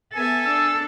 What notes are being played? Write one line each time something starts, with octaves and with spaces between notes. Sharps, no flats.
B3 A4 E5 G#5
D4 E6